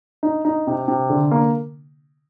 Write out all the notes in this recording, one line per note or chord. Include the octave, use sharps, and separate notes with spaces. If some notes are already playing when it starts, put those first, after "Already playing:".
D#4
D#4
C3
C3
D3
A#3